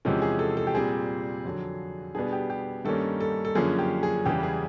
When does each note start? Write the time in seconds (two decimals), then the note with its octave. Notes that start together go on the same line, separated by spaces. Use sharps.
0.05 E2 C3 F3 G#3 C#4
0.22 G#4
0.39 A4
0.57 A4
0.67 G4
0.75 A#2 G3 C4 G#4
1.45 F2 D3 F#3
2.15 B2 G3 B3 D4 G#4
2.32 G4
2.50 G4
2.85 G2 D#3 G3 A#3 C#4 A4
3.20 A4
3.45 A4
3.55 F#2 D3 F3 A#3 C#4 G#4
3.79 G4
4.03 G#4
4.26 E2 C#3 E3 G3 G4
4.43 G#4